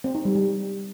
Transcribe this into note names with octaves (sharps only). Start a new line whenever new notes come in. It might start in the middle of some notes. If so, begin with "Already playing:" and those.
C4
D#4
G3
G3